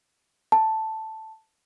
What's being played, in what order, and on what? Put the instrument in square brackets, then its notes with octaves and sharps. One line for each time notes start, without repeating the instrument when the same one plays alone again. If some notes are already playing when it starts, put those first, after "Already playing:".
[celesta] A5